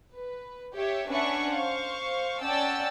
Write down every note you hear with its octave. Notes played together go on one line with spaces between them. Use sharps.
B4
G4 C#5 E5
C#4 D4 B4 E5 F#5 C#6
C5 F5 C#6
C#4 D5 F#5 G5 A5 E6